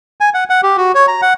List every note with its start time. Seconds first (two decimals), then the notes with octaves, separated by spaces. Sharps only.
0.21 G#5
0.34 F#5
0.50 F#5
0.63 G4
0.77 F#4
0.95 C#5
1.08 A#5
1.22 F#5